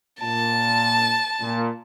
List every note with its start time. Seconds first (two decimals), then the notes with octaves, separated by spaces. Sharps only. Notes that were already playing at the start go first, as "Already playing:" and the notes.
0.21 A#2 A5
1.41 A#2